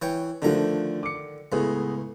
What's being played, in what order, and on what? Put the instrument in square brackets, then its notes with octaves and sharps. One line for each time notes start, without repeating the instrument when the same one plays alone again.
[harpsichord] E3 C#5 G5
[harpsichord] D3 D#3 A#5 [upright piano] F3 A3 D4
[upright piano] D6 C#7
[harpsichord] C#2 A2 [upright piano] B3 G#4